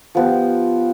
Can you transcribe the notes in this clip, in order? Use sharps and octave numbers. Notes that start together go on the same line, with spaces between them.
F3 B3 G4